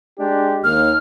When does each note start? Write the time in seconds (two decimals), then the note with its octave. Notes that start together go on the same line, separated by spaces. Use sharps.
0.18 G#3 D4 G4
0.64 D#2 F6